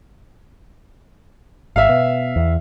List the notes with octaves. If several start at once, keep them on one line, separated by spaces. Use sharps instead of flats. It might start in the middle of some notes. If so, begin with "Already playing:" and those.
G#1 E5 F5
B2
E2